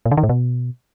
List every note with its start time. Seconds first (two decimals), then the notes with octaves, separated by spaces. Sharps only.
0.06 A#2
0.11 D3
0.17 D#3
0.23 A2
0.29 B2